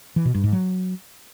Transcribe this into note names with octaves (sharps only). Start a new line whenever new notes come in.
E3
B2
G2
G#2
F#3